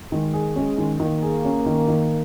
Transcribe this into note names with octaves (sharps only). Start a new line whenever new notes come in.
D#3 G#3
G#4
G#3 C#4
D#3
D#3 A#3
G#4
C#4
D#3
D#3